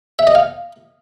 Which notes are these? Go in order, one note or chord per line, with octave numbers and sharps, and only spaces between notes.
E5
D#5
F5